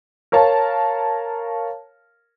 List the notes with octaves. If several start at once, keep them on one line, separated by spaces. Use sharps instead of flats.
A#4 C#5 F5 A5